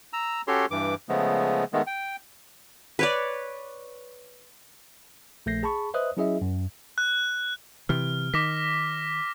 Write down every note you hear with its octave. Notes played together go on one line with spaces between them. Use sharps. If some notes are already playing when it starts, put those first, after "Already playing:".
A#5 E6
C#4 F#4 G4 A4 C#5 C6
G2 E3 D6
C#3 F3 G#3 A3 B3
D#3 G#3 A3 B3
G5
B4 C#5 D5
A#1 A3 G6 A#6 C7
G#4 A5 B5 C#6
B4 C5 D#5 E5 D#6 F#6
F#3 C#4 E4 G#4 D#5 E5
F#2
F#6
C3 E3 F6
D#3 D6 A#6 B6